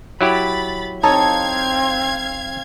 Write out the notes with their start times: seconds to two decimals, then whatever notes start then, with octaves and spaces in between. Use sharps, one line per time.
0.21 F#3 E4 G4 B5 A6
1.03 C4 D#4 A4 C#5 F5 G#6